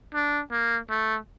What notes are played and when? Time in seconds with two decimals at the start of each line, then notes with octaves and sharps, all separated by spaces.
0.14 D4
0.51 A#3
0.90 A3